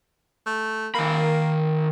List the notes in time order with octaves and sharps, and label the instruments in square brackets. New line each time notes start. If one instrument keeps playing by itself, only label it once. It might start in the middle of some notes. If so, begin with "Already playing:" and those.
[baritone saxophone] A3
[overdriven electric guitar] D#3 B5 [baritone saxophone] A#3